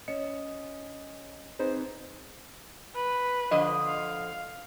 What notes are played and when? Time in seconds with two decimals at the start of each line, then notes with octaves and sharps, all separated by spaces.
0.08 C#4 D#5 C#7
1.59 C4 D#4 G#4 B4 C5
2.95 B4
3.51 D3 F3 D#5
3.86 F5